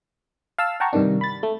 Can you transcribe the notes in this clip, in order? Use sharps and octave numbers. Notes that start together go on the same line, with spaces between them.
F5 A5 E6
F#5 G5 A5 A#5 C#6
G2 C3 D#3 D4
B5 A6
A3